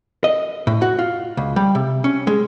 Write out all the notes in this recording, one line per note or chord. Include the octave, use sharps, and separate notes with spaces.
D#5
A2
F#4
F4
C#2
G3
C3
C#4
G#3